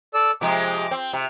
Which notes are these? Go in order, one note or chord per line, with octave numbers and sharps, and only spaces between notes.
A4 D5 E6
C3 F3 G#3 D6
C4
C3